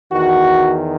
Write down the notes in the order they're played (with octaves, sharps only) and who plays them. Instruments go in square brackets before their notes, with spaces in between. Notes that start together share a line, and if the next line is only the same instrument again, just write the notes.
[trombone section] E2 D#3 F#4